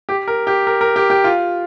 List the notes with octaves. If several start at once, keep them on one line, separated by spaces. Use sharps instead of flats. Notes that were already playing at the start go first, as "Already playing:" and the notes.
G4
A#4
G4
A#4
A#4
G4
G4
F4